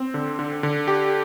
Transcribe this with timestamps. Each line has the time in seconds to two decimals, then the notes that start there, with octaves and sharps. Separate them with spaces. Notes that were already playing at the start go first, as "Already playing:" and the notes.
Already playing: C4
0.14 D3
0.39 D3
0.63 D3
0.88 G4